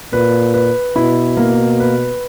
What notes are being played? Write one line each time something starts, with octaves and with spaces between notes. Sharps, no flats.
A#2 B4
B4
B2 E4
A#3
B4